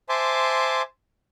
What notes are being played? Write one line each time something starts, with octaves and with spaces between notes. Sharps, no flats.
C5 E5 G#5 A5 C6 D6